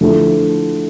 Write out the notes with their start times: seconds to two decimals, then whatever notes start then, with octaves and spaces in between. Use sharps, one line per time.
0.01 D3 F3 A3 E4 A4